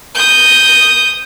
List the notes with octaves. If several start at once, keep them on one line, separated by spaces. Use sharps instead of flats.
D#6 G6